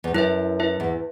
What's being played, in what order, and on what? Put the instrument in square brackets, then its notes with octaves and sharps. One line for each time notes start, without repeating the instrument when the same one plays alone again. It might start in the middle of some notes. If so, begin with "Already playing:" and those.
[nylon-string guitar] E2
[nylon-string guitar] F#2 [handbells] E4 B4 E5
[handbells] E4 B4 E5
[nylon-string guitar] E2